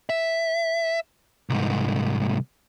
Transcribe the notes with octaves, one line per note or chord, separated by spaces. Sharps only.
E5
C2 G#2